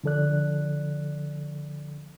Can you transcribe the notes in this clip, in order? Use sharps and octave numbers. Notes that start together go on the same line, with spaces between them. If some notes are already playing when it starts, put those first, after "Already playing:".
D3 F3 A4 D5 F#6